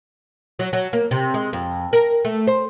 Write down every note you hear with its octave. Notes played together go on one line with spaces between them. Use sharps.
F#3
F#3
A#3
C3
G#3
F2
A#4
A3
C5